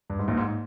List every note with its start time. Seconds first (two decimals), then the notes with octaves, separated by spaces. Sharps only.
0.10 G2
0.19 G#2
0.28 A#1 A#2
0.37 G#2